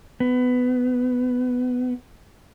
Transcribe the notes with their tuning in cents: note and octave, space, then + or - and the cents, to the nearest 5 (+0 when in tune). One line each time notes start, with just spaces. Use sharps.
B3 +15